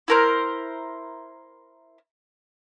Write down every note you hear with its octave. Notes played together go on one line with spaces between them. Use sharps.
E4 A#4 C5